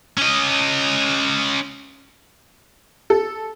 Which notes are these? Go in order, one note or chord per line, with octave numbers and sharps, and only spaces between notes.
C#4 D#5
A4